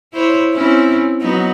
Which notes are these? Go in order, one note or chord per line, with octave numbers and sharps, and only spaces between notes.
E4 C5 C#5
C4 C#4 E4
F#3 B3 D#4